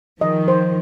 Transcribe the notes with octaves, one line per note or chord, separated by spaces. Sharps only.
D#3 F3 D#5
C5